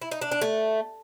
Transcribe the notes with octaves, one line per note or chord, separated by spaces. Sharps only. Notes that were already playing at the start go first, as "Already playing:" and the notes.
E4
D#4
D4
D4
A3